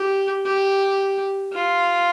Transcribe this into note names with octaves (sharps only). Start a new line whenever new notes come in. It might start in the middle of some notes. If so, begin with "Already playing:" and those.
Already playing: G4
G4
F4